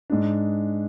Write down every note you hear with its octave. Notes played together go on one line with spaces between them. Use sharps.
G#2 G#3 D4